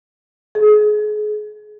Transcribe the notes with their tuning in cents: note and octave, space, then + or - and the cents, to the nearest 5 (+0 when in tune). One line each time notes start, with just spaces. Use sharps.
G#4 +30